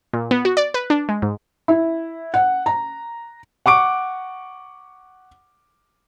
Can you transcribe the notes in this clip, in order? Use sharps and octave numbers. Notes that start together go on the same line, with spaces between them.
A#2
B3
F#4
D5
B4
D4
G#3
G#2
E4
F#5
A#5
F#5 C#6 D6 D7